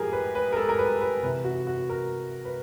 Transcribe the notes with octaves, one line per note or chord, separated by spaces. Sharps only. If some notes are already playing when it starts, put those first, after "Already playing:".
Already playing: A2 F3 G4 G#4 A#4
B4
B4
A#4
A4
A#4
B4
B4
C3 E3 B4
F#4
F#4
A#4
B4